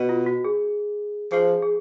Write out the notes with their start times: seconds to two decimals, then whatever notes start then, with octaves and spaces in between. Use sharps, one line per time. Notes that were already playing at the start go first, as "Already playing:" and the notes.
Already playing: B2
0.09 F4
0.26 F#4
0.45 G#4
1.32 F3 G#4
1.62 G#4